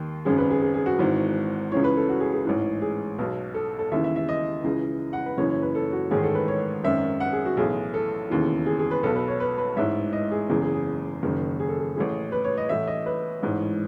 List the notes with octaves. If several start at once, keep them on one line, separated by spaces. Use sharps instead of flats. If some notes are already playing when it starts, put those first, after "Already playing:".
Already playing: D#2 D#3
G#1 F#2 C#3 G#4
B4
G#4
G#4
G#4
F#4
G#1 G#2 E3
C#2 C#3 E3 C#5
B4
A4
F#4
G#4
G#4
A1 G#2 E3
G#4
B1 B2
A4
A4
D#2 C#3 E3 E5
E5
E5
D#5
C#2 C#3 E3
F#5
B4
F#1 F#2 E3 C#5
C#5
B4
A4
F#4
A1 G#2 D#3 G#4
A4
B4
C#5
G#1 F#2 D#3 E5
F#5
G#4
F#4
B1 A2 E3 G#4
A4
E1 D#2 C#3 E3
G#4
G#4
B4
B1 B2 A4
B4
C#5
B4
B4
A1 G#2 E3 E5
D#5
G#4
F#1 E2 C#3 G#4
G#4
G#4
F#1 F#2 D#3
G#4
A4
G#4
A1 A2 E3 G#4
B4
C#5
D#5
A1 A2 E3 E5
D#5
B4
A1 G#2 E3